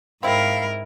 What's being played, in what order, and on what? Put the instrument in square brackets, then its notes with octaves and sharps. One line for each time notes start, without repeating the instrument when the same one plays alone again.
[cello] G#2 A#4 [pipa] C4 E4 [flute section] F5 B5